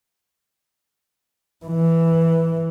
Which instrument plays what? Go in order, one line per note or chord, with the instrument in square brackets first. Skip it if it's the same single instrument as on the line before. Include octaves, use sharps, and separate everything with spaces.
[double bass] E3